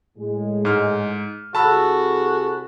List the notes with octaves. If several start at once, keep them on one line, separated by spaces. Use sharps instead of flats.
A2 G#3
G#2 F6
C2 F#4 G#4 A4 A5 B5 E6